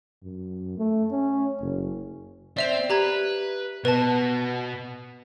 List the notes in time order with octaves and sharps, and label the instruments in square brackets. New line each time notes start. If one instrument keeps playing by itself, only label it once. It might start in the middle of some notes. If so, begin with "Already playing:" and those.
[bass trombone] F#2
A3
C#4
F#1
[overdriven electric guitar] C4 [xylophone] D5 E5 F7
[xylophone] G4 A#5 G#6 [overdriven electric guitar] B4
[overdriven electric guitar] B2 [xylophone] B4 A5